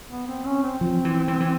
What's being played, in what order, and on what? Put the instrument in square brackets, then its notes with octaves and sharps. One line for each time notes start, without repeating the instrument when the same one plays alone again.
[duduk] B3
C4
C#4
C4
[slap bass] F3
E3
E3
E3